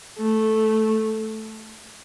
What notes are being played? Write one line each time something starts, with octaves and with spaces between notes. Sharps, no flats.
A3